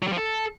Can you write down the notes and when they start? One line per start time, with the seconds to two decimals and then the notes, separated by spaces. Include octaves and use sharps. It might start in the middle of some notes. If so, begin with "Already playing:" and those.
0.02 F#3
0.08 G3
0.13 F3
0.18 A4